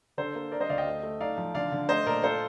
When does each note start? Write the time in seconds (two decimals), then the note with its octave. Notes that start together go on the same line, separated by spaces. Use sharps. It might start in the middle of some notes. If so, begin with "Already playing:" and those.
0.18 D3 A4 C5
0.35 A#3
0.52 D4 A#4 D5
0.61 C5 D#5
0.69 D2 D5 F5
0.78 D#5 G5
0.87 A3
1.03 A3
1.20 D#4 D5 F5
1.38 F3
1.55 D3 D5 F5
1.72 D3
1.89 A3 C5 D#5
2.06 A#2 A#4 D5
2.23 F4 A4 C5